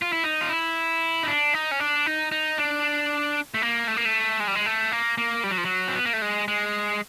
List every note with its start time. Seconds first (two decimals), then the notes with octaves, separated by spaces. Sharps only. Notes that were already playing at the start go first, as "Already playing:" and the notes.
0.02 F4
0.13 E4
0.24 D#4
0.41 F4
0.50 E4
1.23 D#4
1.28 D4
1.54 D#4
1.71 C#4
1.80 D4
2.06 D#4
2.32 D#4
2.58 D4
3.54 A3
3.62 A#3
3.88 A3
3.97 A#3
4.05 A3
4.40 G#3
4.48 G3
4.55 G#3
4.66 A3
4.92 A#3
5.18 A#3
5.44 G3
5.51 F#3
5.58 F3
5.65 F#3
5.88 C4
5.96 B3
6.05 A#3
6.13 A3
6.22 G#3
6.48 G#3